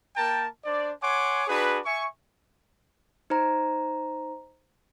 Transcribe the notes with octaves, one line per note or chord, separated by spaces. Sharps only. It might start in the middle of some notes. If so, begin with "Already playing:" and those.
A#3 A#4 G5 A5
D4 C5 D5
C#5 F#5 G#5 C6 D6
D4 F#4 G#4 B4
E5 G#5 C#6
D#4 C5 A#5